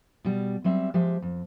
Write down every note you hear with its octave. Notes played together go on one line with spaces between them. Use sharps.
B2 G3
F#3 G3 C4 E5
F3 G#3 G4 E5
F2